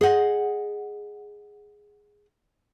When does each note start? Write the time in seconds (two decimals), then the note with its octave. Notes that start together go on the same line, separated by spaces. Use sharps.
0.01 G#4 D#5 F#5